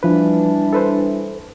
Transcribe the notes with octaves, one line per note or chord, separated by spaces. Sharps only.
E3 F3 G3 D4 B4
A4 B4 C5